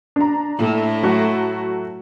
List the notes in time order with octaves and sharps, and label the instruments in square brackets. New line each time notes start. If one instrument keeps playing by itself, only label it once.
[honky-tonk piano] D4 A#5
[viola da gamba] A2
[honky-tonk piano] F#3 A3 F#4